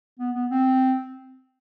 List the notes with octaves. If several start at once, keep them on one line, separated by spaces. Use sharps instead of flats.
B3
B3
C4